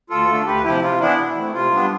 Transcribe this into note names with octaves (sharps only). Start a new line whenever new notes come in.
D2 F4 A4
D3 A3 D4
D2 G4 B4
C3 F3 E4 G4
C3 F4
E3 B3 D4 E4
B2
A3 C4
C3 F4
G3 B3 D4